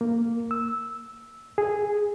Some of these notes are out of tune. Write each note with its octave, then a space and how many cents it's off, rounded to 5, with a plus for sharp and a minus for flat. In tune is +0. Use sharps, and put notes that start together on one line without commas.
A#3 -5
E6 -10
G#4 -5